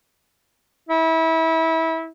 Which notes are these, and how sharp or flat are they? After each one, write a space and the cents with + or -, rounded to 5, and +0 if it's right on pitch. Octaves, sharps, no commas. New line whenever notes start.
E4 -25